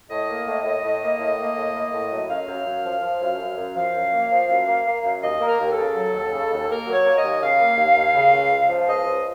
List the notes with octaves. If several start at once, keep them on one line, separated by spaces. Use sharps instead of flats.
A2 D#5
A#3
A2
A2
A2
A#3
A2
A#3
A2
A#3
A2
F#3
F#2 F5
F#2
F#2
F3
F3
F#2
F#2
F#2
F3 F5
F#2
A#3
F3
F#2
A#3
A#3
F#2
D#2 D#5
A#3
A#4
D#2
A4
C#3
F#3
D#2
C#3
D#2
A#3 A#4
F#3
C#5
A#3
D#5
D#2
C#3 F5
A#3
D#2
D#2
C#3
C#2
C#2
F3
C#2 D#5
F3